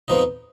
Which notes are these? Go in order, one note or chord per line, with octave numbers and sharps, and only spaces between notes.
F2 F3 B3 D#4